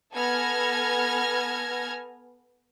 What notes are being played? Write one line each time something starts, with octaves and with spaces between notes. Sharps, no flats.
B3 A4 G#5 F6 G#6 A#6